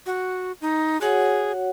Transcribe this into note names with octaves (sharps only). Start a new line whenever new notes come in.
F#4
D#4
F#4 G#4 C#5 F#5